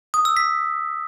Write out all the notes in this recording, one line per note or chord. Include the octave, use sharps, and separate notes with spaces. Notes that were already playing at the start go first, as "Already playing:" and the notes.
D#6
E6
B6